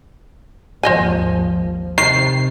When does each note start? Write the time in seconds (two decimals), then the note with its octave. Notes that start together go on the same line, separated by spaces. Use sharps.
0.83 G#1 D#2 F3 C5 D#5 G#5
1.98 C3 D#3 C7